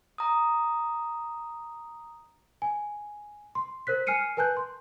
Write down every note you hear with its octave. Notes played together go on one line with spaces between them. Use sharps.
A#5 D#6
G#5
C6
A#4 C5 F#6 B6
G#5 F6 C7 C#7 D#7
A#4 B4 G#5 A5 F#6 G6
C6